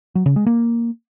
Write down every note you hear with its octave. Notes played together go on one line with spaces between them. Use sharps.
F#3
C#3
G#3
A#3